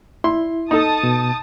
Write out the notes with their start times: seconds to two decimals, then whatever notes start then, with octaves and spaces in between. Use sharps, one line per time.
0.24 E4 C6
0.71 D#4 A4 A5 D#6
1.03 B2